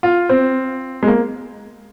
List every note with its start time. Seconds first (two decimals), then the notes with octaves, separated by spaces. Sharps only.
0.03 F4
0.29 C4
1.03 G#3
1.07 A#3